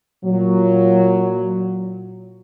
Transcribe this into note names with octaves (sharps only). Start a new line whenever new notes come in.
A#2 F#3